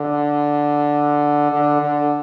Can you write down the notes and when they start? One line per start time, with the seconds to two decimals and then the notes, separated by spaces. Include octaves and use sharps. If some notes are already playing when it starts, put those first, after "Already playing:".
Already playing: D3
1.52 D3
1.82 D3